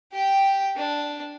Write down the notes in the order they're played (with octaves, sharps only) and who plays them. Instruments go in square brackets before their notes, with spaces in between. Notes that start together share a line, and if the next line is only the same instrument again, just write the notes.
[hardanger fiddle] G4 G5
D4